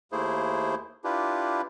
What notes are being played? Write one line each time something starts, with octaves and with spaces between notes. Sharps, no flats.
D#2 A3 A#3 E4 G#4 C5
D4 E4 F4 G4 B4